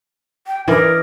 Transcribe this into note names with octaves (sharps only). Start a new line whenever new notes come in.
G5
E3 A#4 D5 D#5